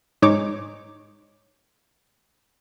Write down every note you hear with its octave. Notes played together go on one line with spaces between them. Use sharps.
G#2 G#3 D#4 C#5 D6